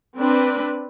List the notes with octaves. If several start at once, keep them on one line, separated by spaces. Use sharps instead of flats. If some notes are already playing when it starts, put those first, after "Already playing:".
C4 D4 B4